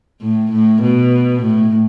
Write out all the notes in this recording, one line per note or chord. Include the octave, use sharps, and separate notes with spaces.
A2
A2
B2
A2